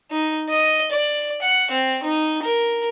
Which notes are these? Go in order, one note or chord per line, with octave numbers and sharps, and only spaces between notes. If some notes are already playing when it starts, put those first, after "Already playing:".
D#4
D#5
D5
F#5
C4
D#4
A#4